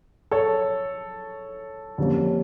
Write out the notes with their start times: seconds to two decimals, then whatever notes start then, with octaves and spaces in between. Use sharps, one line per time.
0.31 A4 C#5
1.98 F2 D3 G3 A#3 C#4